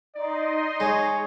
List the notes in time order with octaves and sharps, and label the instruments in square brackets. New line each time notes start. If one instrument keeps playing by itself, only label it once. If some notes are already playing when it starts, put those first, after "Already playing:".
[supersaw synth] D#4 D#5 C6 [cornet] D5
[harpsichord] G#3 [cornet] C#5